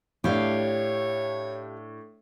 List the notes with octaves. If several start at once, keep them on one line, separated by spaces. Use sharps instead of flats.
A2 D4 G4 C#5 F5